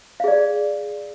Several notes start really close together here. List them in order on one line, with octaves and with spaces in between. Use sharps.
F5 G#4 D5